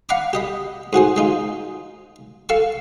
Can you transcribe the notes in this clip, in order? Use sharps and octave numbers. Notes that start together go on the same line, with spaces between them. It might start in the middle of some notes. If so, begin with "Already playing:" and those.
F5 F#5 A#5 B5 D6
G4 D#5 B5
G#2 F#4 G#4 C5
G#3 D#4 F4
A4 F5 A5 C#6